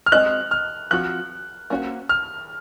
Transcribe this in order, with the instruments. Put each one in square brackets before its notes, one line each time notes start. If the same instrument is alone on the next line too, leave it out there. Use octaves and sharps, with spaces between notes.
[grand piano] F6
[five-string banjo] G#3 C4 F#4 C5 D#5 [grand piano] F#6
[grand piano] F6
[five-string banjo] F3 C4 F#4 [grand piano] F#6
[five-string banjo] A#3 C#4 F#4 C5
[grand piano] F6